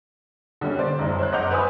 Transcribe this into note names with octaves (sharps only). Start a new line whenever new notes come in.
D3 G3 A#3 C#4
C5 D5
F#1 C2
C5 C#5 C6 F#6
F#1 D#5 F#5 D6 G6 F7
B4 C5 G#5 B5 D#6